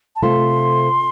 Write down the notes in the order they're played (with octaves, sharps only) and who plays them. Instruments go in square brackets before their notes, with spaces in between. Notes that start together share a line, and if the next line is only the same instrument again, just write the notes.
[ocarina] A5
[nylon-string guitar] C3 A3 C4 F4 C5 [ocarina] C6